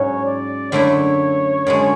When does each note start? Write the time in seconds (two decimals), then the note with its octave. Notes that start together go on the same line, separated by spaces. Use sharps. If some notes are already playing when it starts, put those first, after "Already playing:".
Already playing: G#2 F#3 C#4 C#5
0.25 D5
0.72 F#2 D3 A3 E4 C#5
1.67 F#2 D3 G#3